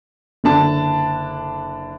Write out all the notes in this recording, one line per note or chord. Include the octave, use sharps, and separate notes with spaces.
F#1 D3 D4 A5